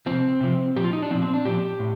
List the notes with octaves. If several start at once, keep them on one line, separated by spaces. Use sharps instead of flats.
C3 F3 C4
C3 F3
A#2 F3 G4
F4
D#4
D4
A#2 F3 C4
C4
D4
A#2 F3 G4
A2